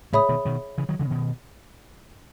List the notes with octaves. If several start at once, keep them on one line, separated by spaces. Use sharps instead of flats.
A2 C#3 G#4 C#5 E5 B5 D#6
B2 D#3
B2 D#3
C#3 E3
D#3 F#3
C#3 E3
B2 D#3